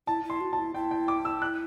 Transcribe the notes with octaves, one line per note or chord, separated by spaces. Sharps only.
E4 A5
E4
C6
F#4
E4 A5
E4 G5
G5
D6
E6
F#6